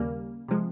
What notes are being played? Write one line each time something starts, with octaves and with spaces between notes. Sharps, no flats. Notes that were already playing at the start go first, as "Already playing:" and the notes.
Already playing: D#2 C#3 G3 A#3
C3 F3 G#3